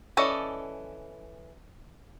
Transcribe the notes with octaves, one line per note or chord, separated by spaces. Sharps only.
E3 C#4 A4 D5 D#5